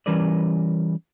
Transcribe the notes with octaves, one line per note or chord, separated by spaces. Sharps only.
E3 G3 C#4 A#4 B4 D5